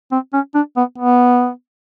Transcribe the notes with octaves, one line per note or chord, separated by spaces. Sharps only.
C4
C#4
D4
B3
B3